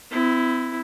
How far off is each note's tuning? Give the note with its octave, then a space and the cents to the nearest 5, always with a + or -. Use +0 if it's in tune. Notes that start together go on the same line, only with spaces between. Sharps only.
C4 -35 E4 +0